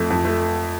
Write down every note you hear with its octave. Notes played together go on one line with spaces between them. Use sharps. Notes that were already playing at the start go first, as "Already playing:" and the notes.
Already playing: F2 A3
F2
A3